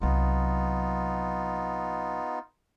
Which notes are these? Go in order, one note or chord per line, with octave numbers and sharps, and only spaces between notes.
C2 F#3 B3 D#4 F4